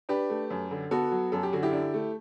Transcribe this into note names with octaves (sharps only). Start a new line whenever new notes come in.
D4 G4 B4
A3
F#2
D3
B3 F#4 A4
F#3
F#2 A4
G4
D3 F#4
E4 G4
D4
A3